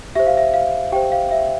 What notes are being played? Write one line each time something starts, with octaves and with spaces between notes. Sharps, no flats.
G4 C5 E5
F5
E5
F5
G4 C5 G5
F5
E5